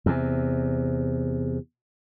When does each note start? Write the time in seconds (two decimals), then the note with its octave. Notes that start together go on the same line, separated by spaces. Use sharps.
0.06 E2 C3